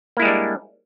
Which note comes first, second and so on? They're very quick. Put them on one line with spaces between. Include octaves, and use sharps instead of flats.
A#3 E4 G#3 G3 D4